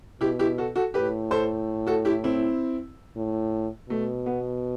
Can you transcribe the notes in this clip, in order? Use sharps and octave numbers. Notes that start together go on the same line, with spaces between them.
B2 E4 G4
E4 G4
F#4 A4
F#4 A4
A2 G4 B4
A4 C5
F#4 A4
E4 G4
C4 E4
A2
B2 A3
B3